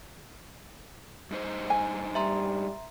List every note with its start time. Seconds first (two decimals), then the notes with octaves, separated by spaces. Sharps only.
1.31 G2 D#4 C5
1.70 G#5
2.15 G3 E5 A#5 C6